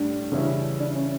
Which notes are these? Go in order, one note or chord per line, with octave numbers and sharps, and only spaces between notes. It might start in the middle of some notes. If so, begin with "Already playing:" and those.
Already playing: A2 G3 D4
C#3 E3 G3 C#4 E4
D4
C#4